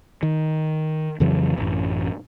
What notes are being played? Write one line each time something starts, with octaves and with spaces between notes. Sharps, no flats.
D#3
F2 C#3 E3 F#3
A1 F#2